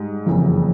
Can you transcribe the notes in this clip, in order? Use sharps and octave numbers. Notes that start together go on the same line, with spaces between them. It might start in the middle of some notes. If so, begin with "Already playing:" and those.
Already playing: G#2 G3
F#1 F2 C#3 E3